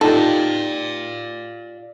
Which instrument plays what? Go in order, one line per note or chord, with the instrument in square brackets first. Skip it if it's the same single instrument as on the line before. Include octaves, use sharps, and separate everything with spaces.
[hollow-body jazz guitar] D#4 F4 G4 [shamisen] A4 [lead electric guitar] D5 F5